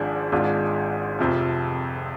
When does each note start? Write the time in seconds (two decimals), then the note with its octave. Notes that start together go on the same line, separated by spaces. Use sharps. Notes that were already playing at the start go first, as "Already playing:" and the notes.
Already playing: G#1 G#2 F3 G#3 D4
0.32 G#1 G#2 G#3 D4 F4
1.19 F1 F2 C3 F3